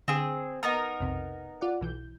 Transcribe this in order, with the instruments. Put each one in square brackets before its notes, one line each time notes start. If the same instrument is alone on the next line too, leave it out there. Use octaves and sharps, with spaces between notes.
[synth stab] D3 [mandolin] C4 G#4
[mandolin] B3 D#4 A#4
[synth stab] B1 F2 C3
F4 D5 F#5
B1 E3 G6